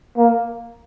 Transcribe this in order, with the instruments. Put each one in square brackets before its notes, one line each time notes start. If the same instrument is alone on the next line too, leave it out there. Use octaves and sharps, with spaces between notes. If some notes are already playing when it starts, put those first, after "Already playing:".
[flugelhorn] A#3